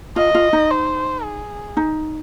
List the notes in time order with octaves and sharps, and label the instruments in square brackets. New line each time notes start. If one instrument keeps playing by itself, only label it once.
[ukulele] F4 [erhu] D#5
[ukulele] F4
D#4
[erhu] C5
G#4
[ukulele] D#4